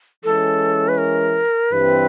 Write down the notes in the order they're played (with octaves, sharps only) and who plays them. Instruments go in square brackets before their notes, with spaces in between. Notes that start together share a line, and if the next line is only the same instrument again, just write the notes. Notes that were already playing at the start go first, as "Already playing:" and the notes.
[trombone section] E3 G#3 C#4 [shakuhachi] A4
[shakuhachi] B4
A#4
[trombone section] G2 E3 G3 C4 [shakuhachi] B4